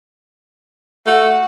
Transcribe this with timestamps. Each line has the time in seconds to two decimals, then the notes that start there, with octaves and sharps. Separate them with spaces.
1.06 A3 F#4 F#5